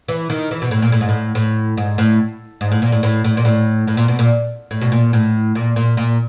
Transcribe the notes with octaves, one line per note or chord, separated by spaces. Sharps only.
E3
D#3
E3
B2
A2
A#2
A2
G#2
A2
A2
G#2
A2
G#2
A2
A#2
A2
A2
A2
A#2
A2
A2
A#2
B2
A#2
A2
B2
A#2
A2
A#2
A#2
A#2